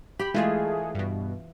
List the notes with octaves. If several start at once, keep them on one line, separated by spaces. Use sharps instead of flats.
G4 B5
E3 G#3 A3 F4 G#4
G2 B2